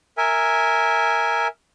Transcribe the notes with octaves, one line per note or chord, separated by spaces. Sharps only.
A#4 E5 G#5